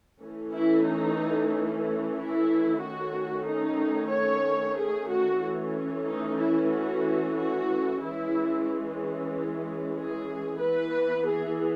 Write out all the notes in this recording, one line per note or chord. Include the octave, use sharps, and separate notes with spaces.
E3 A3 C#4
E4
D#4
E4
D#3 A3 C#4 F#4
D#4
C#5
G#4
F#4
E3 A3 C#4
D#4
E4
F#4
F#4
E3 G#3 C#4 E4
G#4
E3 B3 B4
G#4